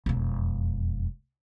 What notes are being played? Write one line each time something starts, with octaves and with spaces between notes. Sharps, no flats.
E1 F2